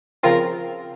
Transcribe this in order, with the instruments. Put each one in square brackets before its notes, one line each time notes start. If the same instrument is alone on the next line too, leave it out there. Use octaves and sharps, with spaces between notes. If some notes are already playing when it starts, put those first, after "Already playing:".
[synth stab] C#3 F3 C4 F4 [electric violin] A#4